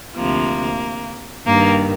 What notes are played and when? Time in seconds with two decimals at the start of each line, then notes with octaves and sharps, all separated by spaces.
0.16 D2 C3 F3 A#3
1.46 G2 D#3 A#3